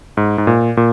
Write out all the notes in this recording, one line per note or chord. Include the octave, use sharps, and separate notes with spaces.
G#2
G#2
A#2
A#2